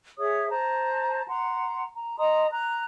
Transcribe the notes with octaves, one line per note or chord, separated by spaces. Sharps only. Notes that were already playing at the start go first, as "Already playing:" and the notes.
G#4 C#5 E5 D#6
C5 A5 A#5
F#5 A#5 C6
A#5
D#5 A#5 C6 D#6
A#5 F#6